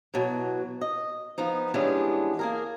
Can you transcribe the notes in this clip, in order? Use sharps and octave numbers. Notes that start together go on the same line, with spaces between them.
B2 E3 F#3
D#5
F3 B3 D#4
E3 G3 G#3 B3 C#4 D4
A#3 G#4 A#4